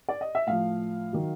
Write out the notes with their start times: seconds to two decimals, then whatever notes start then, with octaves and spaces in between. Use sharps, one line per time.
0.09 D5
0.21 D#5
0.35 E5
0.47 A2 F3 F5
1.13 D#3 F#3